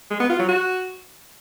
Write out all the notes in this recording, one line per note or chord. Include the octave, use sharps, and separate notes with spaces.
G#3
B3
F4
F#3
F#4